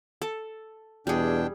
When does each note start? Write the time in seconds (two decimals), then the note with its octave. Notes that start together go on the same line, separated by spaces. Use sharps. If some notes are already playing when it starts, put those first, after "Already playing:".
0.22 A4
1.07 E2 B2 G3 D4 G#4 G5